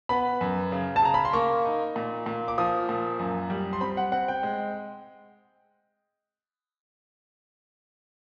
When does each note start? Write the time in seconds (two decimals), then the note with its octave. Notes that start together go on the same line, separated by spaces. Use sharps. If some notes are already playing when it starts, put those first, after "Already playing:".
0.09 B3 B5
0.41 F#2
0.72 C#3
0.96 A5
1.03 C#3 A#5
1.14 B5
1.25 C6
1.33 A#3 C#6
1.65 D#4
1.96 A#2
2.26 A#2
2.48 D6
2.58 F3 D#6
2.89 A#2
3.19 F#2
3.50 G3
3.73 C6
3.81 C4 B5
3.97 F#5
4.12 C4 F#5
4.28 G5
4.43 G#3